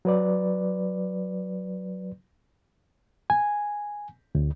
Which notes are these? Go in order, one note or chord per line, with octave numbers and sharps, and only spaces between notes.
F#3 B4 D5
G#5
D2